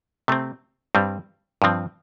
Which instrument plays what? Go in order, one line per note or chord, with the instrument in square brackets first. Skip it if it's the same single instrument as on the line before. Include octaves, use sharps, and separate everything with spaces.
[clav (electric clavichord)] C3 A3 C4
G2 G3 C4
G2 F3 C4